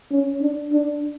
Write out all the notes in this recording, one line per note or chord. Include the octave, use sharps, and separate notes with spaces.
C#4
D4
D4